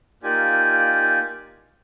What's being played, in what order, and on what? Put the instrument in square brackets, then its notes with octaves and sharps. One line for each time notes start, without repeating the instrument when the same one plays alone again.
[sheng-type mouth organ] A#3 D#4 F4 G4 D5 G#5